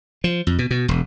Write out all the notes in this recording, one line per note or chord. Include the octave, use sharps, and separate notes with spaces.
F3
F2
B2
B2
E1